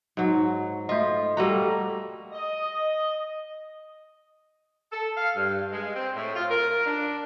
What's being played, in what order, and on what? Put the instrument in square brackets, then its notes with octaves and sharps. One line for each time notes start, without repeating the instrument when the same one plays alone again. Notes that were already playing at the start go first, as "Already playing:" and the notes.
[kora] G#2 F#3
[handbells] A3 D#5 [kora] F4
[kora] G3 A#3 F#4 [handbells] A4 A#5
[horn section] D#5
[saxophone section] A4
F5
G2
G#3
C4
A2
F4
A#4
D4